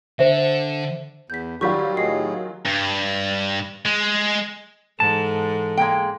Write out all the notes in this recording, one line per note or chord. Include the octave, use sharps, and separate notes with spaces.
D3 C5 E5
E2 G6 B6
D#3 F#3 G3 F4 G4 C#6 G6 B6
A2 G#4 D#5 C7
G2
G#3
G#2 E3 A4 A5
G#3 A#3 G5